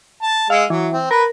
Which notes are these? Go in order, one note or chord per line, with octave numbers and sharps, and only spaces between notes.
A5
G#3 F5 E6
E3 F#3
C4
A#4 B4